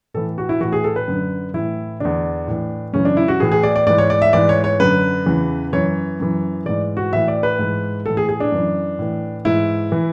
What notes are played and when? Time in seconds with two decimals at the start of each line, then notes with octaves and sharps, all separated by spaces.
0.14 A2 E3 A4
0.38 F#4
0.49 E4
0.60 A2 E3 F#4
0.73 G#4
0.84 A4
0.96 B4
1.08 F#2 D3
1.54 A2 E3 E4
2.00 E2 D3 D4
2.47 A2 E3
2.93 F#2 C#3 E3 C#4
3.05 D4
3.17 E4
3.28 F#4
3.40 A2 E3 G#4
3.52 G#4
3.63 D5
3.76 D5
3.87 G#2 E3 D5
3.98 C#5
4.10 D5
4.22 E5
4.33 G#2 E3 D5
4.49 C#5
4.64 C#5
4.80 F#2 D3 B4
5.26 E2 C#3 E3
5.73 F#2 E3 C#5
6.20 F#2 E3
6.66 G#2 E3 D5
6.97 F#4
7.12 A2 E3 E5
7.28 D5
7.43 B4
7.59 G#2 E3
8.06 A2 E3 A4
8.17 G#4
8.29 G#4
8.40 D4
8.52 F#2 E3
8.99 A2 E3
9.45 G#2 E3 E4
9.92 E3